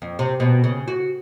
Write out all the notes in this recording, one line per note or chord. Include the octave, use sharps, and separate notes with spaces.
F2
C3
B2
C#3
F#4